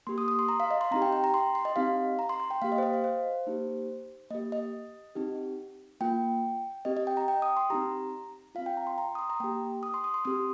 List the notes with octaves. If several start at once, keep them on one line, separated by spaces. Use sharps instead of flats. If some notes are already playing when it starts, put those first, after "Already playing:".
A#3 G4 C6
D#6
D#6
C6
A#5
F5
D#5
C6
C4 D#4 G4 A#5
G5
G5
A#5
C6
C6
D#5
C4 D#4 G4 F5
A#5
C6
C6
G5
A#3 G4 F5
D#5
C5
D#5
F5
C5
A#3 D#4 G4
A#3 G4 D#5
D#5
C4 D#4 G4
A#3 F4 G5
C4 G4 D#5
D#5
G5
A#5
G5
D#6
C6
C4 D#4 G4 A#5
C4 F4 F5
G5
A#5
C6
A#5
D#6
C6
A#5
A#3 G4 G5
D#6
C6
D#6
C6
C4 G4 D#6